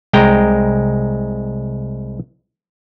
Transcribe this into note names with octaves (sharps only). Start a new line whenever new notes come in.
C2 G#3 G5 A#5